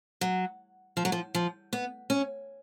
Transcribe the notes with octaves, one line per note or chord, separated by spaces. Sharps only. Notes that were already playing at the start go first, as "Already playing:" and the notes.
F#3
F3
F#3
F3
F3
B3
C#4